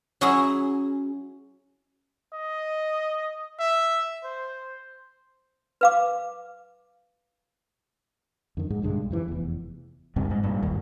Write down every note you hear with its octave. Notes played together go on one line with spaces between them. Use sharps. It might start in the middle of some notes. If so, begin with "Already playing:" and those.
F#3 C#4 E4 F#4 G#4
D#5
E5
C5
B4 F5 D6
F2 D3 D#3
G#2 G#3
B1 G2 D3 G#3
F2 C3 E3
F1 E2
D2 G2 C3
G#2
G2 A#2
G#1 D#2